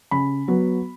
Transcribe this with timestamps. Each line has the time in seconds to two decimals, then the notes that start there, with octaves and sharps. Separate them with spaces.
0.11 C#3 B5
0.48 F#3 B3